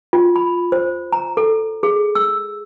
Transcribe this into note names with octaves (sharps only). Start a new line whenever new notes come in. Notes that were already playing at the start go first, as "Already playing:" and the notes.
F4
B5
C5
A#5
A4
G#4
E6